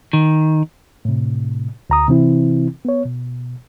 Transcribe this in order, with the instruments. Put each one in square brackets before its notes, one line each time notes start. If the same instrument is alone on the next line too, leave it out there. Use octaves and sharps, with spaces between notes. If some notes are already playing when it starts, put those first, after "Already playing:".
[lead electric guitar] D#3
[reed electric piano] A2 C3
D2 A#5 D#6
C3 E3 C4 E4
B3 C#5
B2